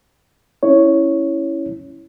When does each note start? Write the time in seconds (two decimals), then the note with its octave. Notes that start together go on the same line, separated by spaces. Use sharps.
0.63 C#4 E4 C#5